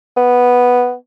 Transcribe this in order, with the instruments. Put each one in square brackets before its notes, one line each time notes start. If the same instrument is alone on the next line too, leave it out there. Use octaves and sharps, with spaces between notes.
[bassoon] B3